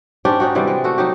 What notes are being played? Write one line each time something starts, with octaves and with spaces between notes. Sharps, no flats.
G#2 C#4 D4 G4
C#4 D#4 F#4
C3 E3 G3 D5
G#3
A3 F#4
F#3 D#4 G4